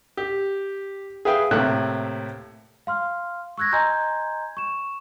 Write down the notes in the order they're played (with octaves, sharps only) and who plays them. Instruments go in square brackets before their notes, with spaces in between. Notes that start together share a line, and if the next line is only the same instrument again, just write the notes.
[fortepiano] G4
G#4 B4 E5 F5 G5
A2 C3 A#3 A4 E5 F#6
[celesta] F5 C6 F6
C#6 E6 F#6 G#6 A#6
D#5 G#5 A#5 C6 G6 G#6
C#6 E7